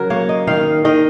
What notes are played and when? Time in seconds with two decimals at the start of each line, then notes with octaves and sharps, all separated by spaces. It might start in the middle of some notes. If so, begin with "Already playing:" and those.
Already playing: C#3 F#3 C#4 A#4
0.10 A#3 C#5
0.29 D#5
0.47 D#3 F5
0.85 D#3 D#5